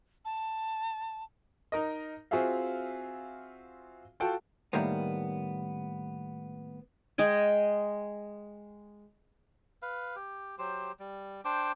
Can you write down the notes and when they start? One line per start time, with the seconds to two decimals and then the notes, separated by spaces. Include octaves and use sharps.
0.25 A5
1.72 D#4 A#4 D#5
2.31 C4 F4 F#4 G#4 E5 F5
4.20 F4 F#4 A4 G5 A5
4.73 A2 D#3 G3 A#3 B3
7.18 G#3 D#5 G5 G#5
9.82 B4 F5
10.16 G4
10.58 F#3 G4 C5
10.99 G3
11.45 D4 C5 G5 D6